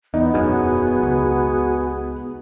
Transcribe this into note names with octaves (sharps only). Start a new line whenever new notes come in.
E2 B3 D#4
E1 F#2 F#4 G#4
C#2